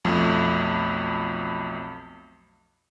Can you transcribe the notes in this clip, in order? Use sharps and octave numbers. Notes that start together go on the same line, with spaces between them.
B1 F2 F3 A3